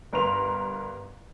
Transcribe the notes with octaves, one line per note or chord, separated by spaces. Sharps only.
G1 A#4 B4 A#5 C6 F7